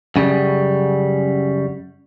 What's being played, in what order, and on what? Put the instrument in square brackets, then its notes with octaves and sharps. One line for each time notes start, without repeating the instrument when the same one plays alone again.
[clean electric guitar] F#2 C#3 G3